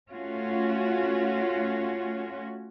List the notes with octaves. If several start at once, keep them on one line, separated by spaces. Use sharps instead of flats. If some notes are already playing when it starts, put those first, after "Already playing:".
A3 C#4 F4 F#4